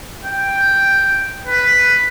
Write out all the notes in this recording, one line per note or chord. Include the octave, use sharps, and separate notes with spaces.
G5
B4